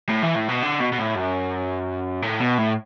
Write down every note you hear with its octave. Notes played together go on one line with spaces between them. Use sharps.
A2
E3
A2
B2
D3
B2
B2
A2
F#2
A2
B2
A2